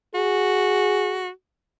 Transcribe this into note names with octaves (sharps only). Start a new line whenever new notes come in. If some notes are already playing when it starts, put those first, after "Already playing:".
F#4 G#4